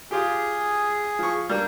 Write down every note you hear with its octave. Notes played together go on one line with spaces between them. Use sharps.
F4 G4 G#4
F3 C#6
G3 A#3 D4